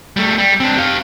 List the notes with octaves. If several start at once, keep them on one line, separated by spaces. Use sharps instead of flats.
G3 A3
G3
C4 D4
G4 F5